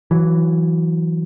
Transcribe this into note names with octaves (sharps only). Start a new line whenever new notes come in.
E3 F#3